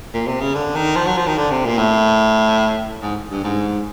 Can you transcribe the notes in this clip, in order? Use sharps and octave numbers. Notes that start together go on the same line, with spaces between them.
A#2
C3
C#3
D3
D#3
F3
F#3
F3
D#3
D3
C3
A#2
A2
G#2
G2
G#2